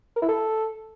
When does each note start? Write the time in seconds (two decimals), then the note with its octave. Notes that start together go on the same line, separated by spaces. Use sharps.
0.16 A#4
0.22 E4
0.28 A4